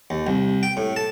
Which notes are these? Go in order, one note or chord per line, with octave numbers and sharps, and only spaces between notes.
D#2
C2
G5
A2
A5